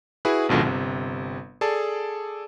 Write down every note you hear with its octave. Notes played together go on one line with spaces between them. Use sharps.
E4 F#4 G#4 B4
G#1 C#2 B2 D3 F3
G1 C3
G#4 A4 D5 A5